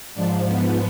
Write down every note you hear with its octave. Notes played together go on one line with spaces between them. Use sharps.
G#2 F3 D4
B3